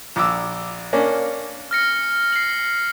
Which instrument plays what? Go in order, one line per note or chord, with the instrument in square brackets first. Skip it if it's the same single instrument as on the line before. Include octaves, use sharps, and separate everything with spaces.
[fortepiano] A#1 D6 E6
A#3 C#4 D4
[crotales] F6 A#6 C#7
C7 F#7